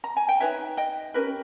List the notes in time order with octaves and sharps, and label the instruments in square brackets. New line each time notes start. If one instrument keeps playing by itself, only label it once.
[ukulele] A#5
G#5
G5
D#4 G#4 B4 C#5 E5
D#5 G5
C#4 G4 A#4 B4